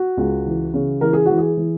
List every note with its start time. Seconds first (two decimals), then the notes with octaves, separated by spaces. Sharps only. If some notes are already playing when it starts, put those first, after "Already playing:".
Already playing: F#4
0.17 C#2
0.46 E3
0.74 C#3
1.01 E3 A#4
1.13 G#4
1.26 E3 F#4
1.38 G#4
1.57 E3